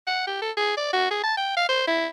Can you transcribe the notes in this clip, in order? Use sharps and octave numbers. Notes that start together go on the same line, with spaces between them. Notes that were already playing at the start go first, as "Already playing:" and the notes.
F#5
G4
A4
G#4
D5
F#4
G#4
A5
G5
F5
C5
E4